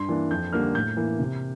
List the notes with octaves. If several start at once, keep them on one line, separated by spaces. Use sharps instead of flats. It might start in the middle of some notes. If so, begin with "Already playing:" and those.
Already playing: G2 C6
E3 A#3 D4
F2 G6
D3 G3 A#3 D4 F6
A2 G6
E3 A#3
C3